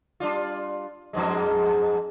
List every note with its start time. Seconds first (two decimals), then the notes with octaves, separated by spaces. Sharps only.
0.20 G3 D4 F4
1.13 F2 G#2 G#3